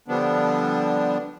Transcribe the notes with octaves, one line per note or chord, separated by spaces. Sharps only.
D3 F3 G3 B3 D4